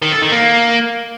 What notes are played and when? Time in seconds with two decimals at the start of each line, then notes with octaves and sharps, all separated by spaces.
0.02 D#3
0.12 A4
0.22 D#3
0.32 A#3